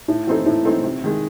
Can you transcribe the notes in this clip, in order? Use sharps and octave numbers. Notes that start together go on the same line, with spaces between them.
A2
E3 C4 D#4 A4
A2
E3 C4 D#4 A4
C3
D#3 G#3